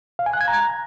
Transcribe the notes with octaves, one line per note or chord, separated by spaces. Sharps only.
F5
G#5
F#6
G#6
A#5